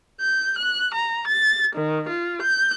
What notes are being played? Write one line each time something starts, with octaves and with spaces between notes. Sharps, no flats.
G6
F#6
A#5
A6
D#3
F4
G6